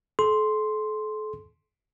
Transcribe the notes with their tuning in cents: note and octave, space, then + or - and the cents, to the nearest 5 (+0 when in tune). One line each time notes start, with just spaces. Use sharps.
A4 -40 C6 +0